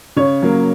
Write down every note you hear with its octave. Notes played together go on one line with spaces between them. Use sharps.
C#3 C#5
F#3 A#3